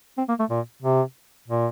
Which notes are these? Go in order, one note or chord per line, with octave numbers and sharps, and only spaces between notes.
C4
A#3
A3
A#2
C3
A#2